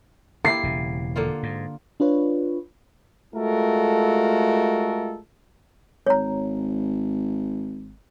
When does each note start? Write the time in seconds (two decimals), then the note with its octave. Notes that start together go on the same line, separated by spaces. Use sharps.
0.45 A#3 E4 G4 C7
0.63 E1 C#3
1.16 D3 A#3 F4
1.43 G#2
2.00 D4 F4 B4 C#5
3.35 G#3 A3 F4 F#4 A4 A#4
6.07 G#1 C#5 A#5